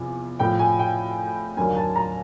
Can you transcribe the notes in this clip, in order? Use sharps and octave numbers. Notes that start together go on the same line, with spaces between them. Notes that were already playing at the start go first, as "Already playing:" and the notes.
Already playing: E2 C3 F3
A2 F3 A3 G5
G#5
G5
D#2 D3 F#3 A#3 G#5
A5
A#5